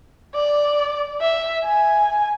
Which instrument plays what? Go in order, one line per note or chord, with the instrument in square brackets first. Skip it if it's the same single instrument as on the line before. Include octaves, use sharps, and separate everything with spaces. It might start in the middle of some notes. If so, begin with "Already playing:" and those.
[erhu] D5
E5
G#5